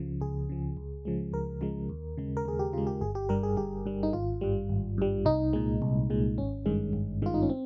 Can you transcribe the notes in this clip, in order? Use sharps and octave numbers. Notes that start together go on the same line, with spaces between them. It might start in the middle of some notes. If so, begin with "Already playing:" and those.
Already playing: C#2 C#3 F3
C#2 G#4
C#3 F3
C#2
C#3 F3 G#3
C#2 A#4
C#3 F3 G#3
D#2
C#3 G#3
A#4
D#2 G#4
G4
C#3 G#3 F4
G4
G1 G#4
G4
G2 G3 A#4
G#4
G1 G4
G2 G3
D#4
G#1 F4
G2 G3
G#1
G2 G3
C2 D#4
A#2 G#3
C2
A#2 G#3
G#1 C#4
G2 D#3 G#3
G#1
G2 D#3 G#3 F4
D#4
C#4
C4